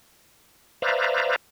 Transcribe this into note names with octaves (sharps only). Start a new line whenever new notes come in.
B4 C5 D5 E5 F5 A#5